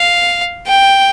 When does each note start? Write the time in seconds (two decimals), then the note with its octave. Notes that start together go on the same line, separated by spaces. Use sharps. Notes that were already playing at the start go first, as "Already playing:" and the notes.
Already playing: F5
0.66 G5